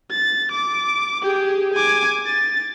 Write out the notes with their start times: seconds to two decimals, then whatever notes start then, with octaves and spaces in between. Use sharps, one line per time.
0.11 A6
0.52 D6
1.23 G4 G#4
1.74 G#5 D6
2.26 A6